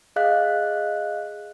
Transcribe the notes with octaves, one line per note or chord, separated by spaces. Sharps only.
G#4 D#5 F5 F#6